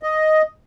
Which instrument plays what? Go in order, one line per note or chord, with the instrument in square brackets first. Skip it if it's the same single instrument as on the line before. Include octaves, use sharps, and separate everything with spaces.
[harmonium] D#5